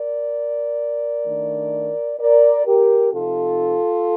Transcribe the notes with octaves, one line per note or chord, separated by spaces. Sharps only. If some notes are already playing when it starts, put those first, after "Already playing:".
Already playing: A#4 D5
D#3 A3 D4
A#4 D5
G4 A#4
C3 F3 C4 D#4 F4 A4